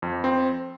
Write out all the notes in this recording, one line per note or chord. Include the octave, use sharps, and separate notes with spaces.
F2
C4